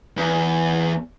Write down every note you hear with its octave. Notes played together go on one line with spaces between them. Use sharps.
E2